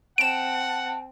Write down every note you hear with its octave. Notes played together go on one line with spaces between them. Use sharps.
C4 F#5 A5 D7 E7